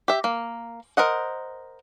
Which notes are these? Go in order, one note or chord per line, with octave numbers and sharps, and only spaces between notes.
G4 E5
A#3
A#4 C5 D#5 F#5